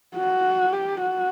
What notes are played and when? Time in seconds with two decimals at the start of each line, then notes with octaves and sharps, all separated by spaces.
0.16 F#4
0.73 G4
1.01 F#4